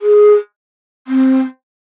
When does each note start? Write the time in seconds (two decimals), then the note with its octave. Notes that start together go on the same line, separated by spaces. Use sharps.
0.01 G#4
1.07 C4